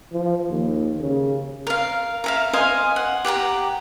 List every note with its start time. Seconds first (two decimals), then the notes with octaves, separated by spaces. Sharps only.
0.12 F3
0.50 D#2
1.00 C#3
1.67 A#4 F5
2.24 A#4 E5 F5
2.53 C5 D#5 F5 G#5
2.96 F#5
3.25 G4 F#5 G#5 A#5